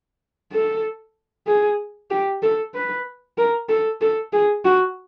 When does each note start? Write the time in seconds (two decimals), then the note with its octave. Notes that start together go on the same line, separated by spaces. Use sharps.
0.52 A4
1.47 G#4
2.11 G4
2.43 A4
2.74 B4
3.38 A#4
3.69 A4
4.01 A4
4.33 G#4
4.65 F#4